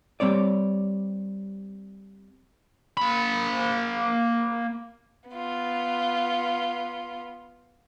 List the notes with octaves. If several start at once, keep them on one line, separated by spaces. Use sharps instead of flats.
G3 C4 C#5 D5
A#3 B5
B3 F4